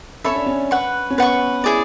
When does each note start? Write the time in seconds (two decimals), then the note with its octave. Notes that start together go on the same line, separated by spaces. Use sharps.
0.24 C#4 A4 C#5 E5 B5
0.35 D4
0.46 C#4
0.71 B4 F#5 C#6
1.10 C#4
1.18 B3 B4 F#5 C#6
1.64 E4 G#4 D5